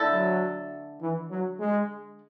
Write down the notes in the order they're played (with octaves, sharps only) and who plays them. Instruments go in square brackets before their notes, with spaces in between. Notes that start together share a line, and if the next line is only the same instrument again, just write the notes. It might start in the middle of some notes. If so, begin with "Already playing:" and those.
Already playing: [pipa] D3 A3 E4 A4
[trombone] F#3
E3
F#3
G#3